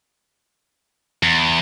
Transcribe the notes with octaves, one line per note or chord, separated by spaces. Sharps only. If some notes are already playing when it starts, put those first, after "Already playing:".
E2